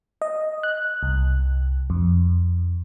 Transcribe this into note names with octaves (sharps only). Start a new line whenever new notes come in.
D#5
F#6
C2
F2